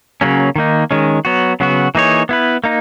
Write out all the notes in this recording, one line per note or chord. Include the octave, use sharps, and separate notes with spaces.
C#3 F#3 A#3 C#4
D#3 A#3 D#4
D#3 G#3 C#4
F#3 B3 F#4
C#3 F#3 B3 F#4
E3 A#3 D#4 G#4 C#5
B3 E4 B4
A#3 D#4